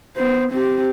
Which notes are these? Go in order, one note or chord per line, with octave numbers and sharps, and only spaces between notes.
B3 C5
C4 G4